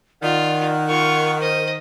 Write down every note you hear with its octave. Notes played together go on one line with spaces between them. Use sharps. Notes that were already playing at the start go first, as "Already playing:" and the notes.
D#3 F4 D5 F#5
F4 A#4 C#6
C5 D#5